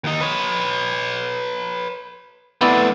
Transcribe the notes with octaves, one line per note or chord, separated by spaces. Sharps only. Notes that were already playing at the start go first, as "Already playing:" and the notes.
D#2 D#4
B4 C#5
A3 B3 C4 E4 D5